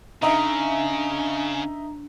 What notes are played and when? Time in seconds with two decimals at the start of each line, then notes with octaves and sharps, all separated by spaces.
0.22 C#3 D4 D#4 D#5 E5 A#5